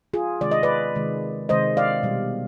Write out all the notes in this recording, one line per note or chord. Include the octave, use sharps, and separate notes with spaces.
F4 G#4
C3 D#3 G#3 D5
D#5
B4 D5
C3 D#3 G#3
C3 D#3 G#3 C5 D#5
D5 F5
B2 G3